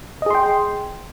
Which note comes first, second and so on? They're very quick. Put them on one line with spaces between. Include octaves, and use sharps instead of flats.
D#5 G#4 C6 G5